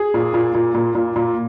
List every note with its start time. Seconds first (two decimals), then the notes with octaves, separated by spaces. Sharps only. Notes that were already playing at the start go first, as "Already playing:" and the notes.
Already playing: G#4
0.14 A#2
0.34 A#2
0.54 A#2
0.74 A#2
0.95 A#2
1.16 A#2